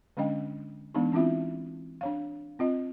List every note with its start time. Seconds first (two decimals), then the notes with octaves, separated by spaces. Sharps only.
0.17 D3 G#3 C#4 D4 D#5 G5
0.94 E3 G#3 B3 D4 D#4
1.12 E3 C4 C#4 E4 F4 E5
2.01 D4 C#5 F5
2.59 C4 F4 D#5